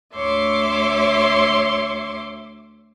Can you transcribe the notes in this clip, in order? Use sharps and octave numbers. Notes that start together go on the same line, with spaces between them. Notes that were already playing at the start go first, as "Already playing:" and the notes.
D2 C#5 E5 C6 D6